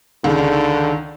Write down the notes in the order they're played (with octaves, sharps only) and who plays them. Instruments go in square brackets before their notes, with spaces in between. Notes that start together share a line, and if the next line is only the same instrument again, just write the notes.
[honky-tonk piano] C#2 D#3 G#3 [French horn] D3